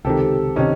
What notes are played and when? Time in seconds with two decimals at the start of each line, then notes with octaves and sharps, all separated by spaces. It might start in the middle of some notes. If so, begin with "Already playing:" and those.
0.05 C#2 C3 D#3 G4 A4
0.56 C3 D#3 C#4 D#4